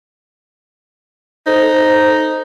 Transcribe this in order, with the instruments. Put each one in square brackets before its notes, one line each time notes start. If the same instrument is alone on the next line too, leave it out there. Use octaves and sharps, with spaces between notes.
[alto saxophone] D#4 [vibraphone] A4 C5